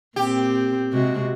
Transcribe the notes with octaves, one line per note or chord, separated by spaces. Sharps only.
A#2 C4 G4
C3 G#3 F#4